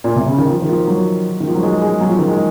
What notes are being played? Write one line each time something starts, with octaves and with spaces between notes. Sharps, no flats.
A#2
C3
C#3
D#3
F3
D#3
F3
F#3
D#3
F3
F#3
G#3
G#3
F#3
F3
D#3
G#3